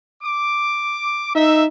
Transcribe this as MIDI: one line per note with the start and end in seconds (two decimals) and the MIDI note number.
0.23 1.35 86
1.35 1.66 63
1.35 1.64 76